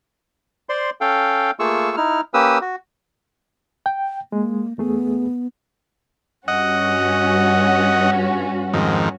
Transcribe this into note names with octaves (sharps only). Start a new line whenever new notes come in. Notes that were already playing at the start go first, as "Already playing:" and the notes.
C5 D5 C6
C#4 A4 F5 G5
A3 A#3 F4 G#4 C#6 E6
D#4 E4 F6
A#3 C#4 G4 B4 D#6 E6
F#4
G5
G#3 A#3
E2 A3 B3 G#4
G2 C#4 F#4 D#5 F#5
F2 G#2 D#3